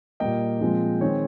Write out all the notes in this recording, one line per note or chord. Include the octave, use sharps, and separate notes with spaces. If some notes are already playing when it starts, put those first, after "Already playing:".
A#2 G3 A#3 D#5 G5
A#2 F3 G#3 C4
D#3 G#3 C4 C#5